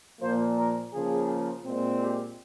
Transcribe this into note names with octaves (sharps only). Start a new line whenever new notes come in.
A#2 F3 A#3 C5
A#4
C#3 F3 A#3 G#4
A#2 G#3 C4
G4